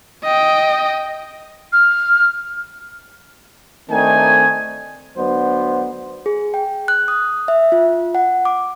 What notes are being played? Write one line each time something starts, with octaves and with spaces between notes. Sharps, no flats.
D#5 G5
F6
D#3 A3 C4 D4 D#4 G#5
D2 F#3 B3 D4 C5
G#4
G5
F#6
D#6
E5
F4
F#5
D6